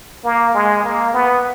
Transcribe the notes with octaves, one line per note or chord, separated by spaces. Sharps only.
A#3
G#3
A#3
B3